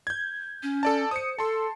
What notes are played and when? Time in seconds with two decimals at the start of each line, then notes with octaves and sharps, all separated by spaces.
0.07 G6 G#6
0.63 C#4
0.83 A4 D5 A5
1.11 C5 D#6 C#7
1.39 A4 A5 C6